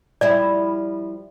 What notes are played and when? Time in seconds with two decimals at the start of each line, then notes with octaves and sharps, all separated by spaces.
0.21 F3 G3 E4 D5